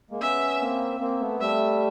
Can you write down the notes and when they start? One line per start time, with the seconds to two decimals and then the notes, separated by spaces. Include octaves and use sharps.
0.11 G#3 A#3
0.21 B3 C#4 E5
0.61 A#3 C4
1.00 A#3 C4
1.21 A3 B3
1.40 G3 A3 E5